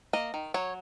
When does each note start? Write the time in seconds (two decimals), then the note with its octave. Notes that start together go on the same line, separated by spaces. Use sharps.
0.13 A#3 D#5
0.34 D#3
0.54 F#3 C#5